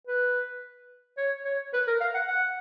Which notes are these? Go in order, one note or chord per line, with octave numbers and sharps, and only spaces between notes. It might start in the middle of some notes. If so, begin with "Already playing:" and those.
B4
C#5
C#5
B4
A#4
F5
F#5
F#5